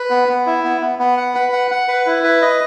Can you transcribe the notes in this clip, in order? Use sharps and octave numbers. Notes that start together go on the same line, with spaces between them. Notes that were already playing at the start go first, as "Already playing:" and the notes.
Already playing: B4
B3
B3
E4
B3
B3
B3
F#5
B4
F#5
F#5
B4
E4
B4
D#5